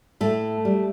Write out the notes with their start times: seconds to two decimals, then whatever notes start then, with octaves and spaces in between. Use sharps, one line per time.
0.21 A2 A3
0.65 G3